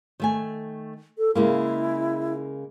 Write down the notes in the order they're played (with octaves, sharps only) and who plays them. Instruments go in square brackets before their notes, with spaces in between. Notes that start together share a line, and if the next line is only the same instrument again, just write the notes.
[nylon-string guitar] D#3 A3 G#5
[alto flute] A4
[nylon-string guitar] C#3 G#3 A#3 [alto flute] E4